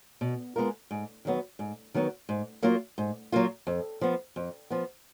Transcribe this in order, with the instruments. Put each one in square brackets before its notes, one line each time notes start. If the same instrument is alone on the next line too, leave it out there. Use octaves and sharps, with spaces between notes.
[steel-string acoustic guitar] B2
G#3 B3 F4 A#4
G#2
D#3 F#3 B3
G#2
D#3 F#3 B3
G#2
F#3 A#3 F4
G#2
F#3 A#3 F4
F2
F3 B3
F2
F3 B3